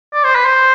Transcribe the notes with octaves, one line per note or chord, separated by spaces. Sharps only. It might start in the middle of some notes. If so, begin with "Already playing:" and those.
D5
C5
B4
C5